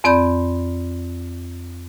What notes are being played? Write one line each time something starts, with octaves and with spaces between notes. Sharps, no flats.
F2 C4 D5 B5 G6